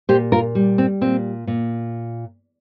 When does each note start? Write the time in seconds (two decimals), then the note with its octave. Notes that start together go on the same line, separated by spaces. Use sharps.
0.09 A#2 G4 C5
0.32 F4 A#4
0.55 G3
0.78 C4
1.01 A#2 C4
1.47 A#2